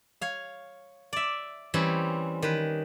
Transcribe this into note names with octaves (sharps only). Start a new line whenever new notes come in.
C#5 F5
D5 E5
E3 G3 C4 C#4
D#3 B4